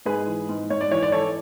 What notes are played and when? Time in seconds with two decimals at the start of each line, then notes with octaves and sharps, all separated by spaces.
0.06 G#2 G#4 B4
0.27 E3
0.49 G#2
0.70 G#2 C#5
0.81 D5
0.91 E3 C#5
1.03 D5
1.12 E3 A4 C#5